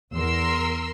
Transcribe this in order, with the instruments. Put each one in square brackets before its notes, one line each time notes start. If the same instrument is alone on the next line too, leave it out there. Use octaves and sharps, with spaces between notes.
[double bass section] E2 [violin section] A#4 C6 E6